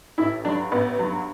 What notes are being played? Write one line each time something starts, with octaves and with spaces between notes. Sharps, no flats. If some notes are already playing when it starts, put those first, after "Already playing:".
A1 E4
G2 F#3 D4
A1 B3
G2 F#3